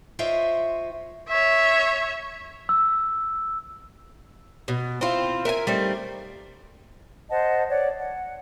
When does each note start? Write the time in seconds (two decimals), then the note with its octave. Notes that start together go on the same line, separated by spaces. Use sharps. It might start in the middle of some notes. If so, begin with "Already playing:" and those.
0.19 F4 C5 C#5 D#5 E5 G5
1.28 C#5 E5
2.69 E6
4.68 B2
5.01 C4 E4 F4
5.45 A#4 E5 G5 G#5
5.67 G3 A3 C4 D#4
7.31 C5 D#5 F#5 A5
7.69 C#5 D5 F#5
7.98 F#5